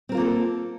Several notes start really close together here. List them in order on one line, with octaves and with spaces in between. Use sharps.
C4 A#4 F4 A#3 A4